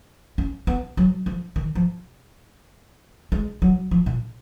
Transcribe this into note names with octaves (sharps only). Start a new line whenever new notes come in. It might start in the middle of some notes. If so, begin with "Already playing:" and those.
C#4
B3
F#3
F3
D#3
F3
G#3
F#3
F3
A#2